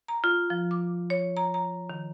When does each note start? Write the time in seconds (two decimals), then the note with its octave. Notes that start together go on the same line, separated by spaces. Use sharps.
0.08 A#5
0.24 F4
0.50 F3
0.71 D6
1.10 C#5
1.37 A#5
1.54 A#5
1.90 D#3